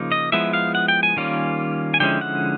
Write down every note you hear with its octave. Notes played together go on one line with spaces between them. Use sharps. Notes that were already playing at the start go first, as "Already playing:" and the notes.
Already playing: C#3 F3 A#3 D#4
D#5
F3 G#3 B3 E4 E5
F5
F#5
G5
G#5
D#3 G3 A#3 C#4 F4
G#5
D3 F3 G#3 C#4 E4 G5
F#5